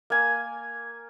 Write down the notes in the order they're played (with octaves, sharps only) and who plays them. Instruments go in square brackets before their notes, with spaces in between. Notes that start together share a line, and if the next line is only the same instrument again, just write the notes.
[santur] A#3 G#5